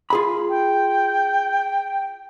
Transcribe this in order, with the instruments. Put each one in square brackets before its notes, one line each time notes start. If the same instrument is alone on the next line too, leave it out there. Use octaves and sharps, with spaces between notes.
[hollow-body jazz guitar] F4 G#4 B5
[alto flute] G5